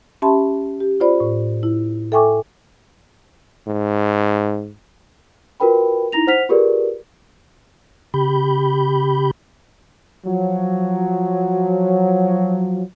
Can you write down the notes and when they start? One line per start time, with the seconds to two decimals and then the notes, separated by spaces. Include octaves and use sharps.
0.22 C#4 G4 E5 A5 B5 C6
0.81 G4
1.00 F4 C5 D5 B5
1.20 A2
1.63 E4
2.12 A4 E5 G5 G#5 C#6 D6
3.67 G#2
5.60 F4 F#4 A#4 B4 G5 B5
6.12 D#4 E4 A#5 A#6 F7
6.27 C5 F#5 F6 B6 F7
6.49 F4 G4 G#4 A#4 B4 D5
8.14 C#3 G4 B5 G6
10.26 F3 F#3